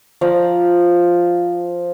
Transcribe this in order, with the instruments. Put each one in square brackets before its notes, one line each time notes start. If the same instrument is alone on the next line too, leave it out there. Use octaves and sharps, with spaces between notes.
[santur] F3 D5 F5 A#5